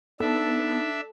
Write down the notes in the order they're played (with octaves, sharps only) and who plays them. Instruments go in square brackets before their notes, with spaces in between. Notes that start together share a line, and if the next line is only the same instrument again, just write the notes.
[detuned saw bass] B3 [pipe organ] D4 E5 [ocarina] D#4 [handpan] A4